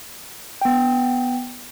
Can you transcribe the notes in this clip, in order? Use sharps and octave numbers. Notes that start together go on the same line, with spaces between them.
B3 G5